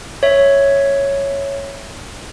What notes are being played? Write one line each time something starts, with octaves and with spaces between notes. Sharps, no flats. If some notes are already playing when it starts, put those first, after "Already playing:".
C#5 E5